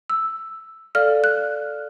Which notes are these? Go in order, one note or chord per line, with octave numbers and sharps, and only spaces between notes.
E6
A4 D5 F5 F6
F#6